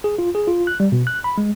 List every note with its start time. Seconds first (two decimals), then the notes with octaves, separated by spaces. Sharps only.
0.04 G#4
0.19 F4
0.35 G#4
0.47 F4
0.67 F#6
0.80 G3
0.92 B2
1.07 F#6
1.24 B5
1.38 G#3